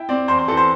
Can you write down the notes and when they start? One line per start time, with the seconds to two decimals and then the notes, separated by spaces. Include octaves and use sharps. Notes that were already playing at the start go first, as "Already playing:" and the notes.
Already playing: E4 G5
0.09 C4 D5
0.28 E2 C5
0.39 C5
0.48 E3 A4
0.57 C5